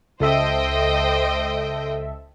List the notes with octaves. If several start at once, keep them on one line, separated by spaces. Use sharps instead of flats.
C#2 A4 C5 D#5 E5 G5